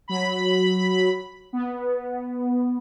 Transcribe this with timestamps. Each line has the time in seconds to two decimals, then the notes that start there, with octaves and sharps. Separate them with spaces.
0.08 F#3 B5
1.53 B3